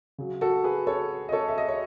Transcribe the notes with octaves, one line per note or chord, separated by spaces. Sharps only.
C#3 F#3
F#4 A4
G#4 B4
A4 C#5
D#5
A4 C#5
E5
D#5
C#5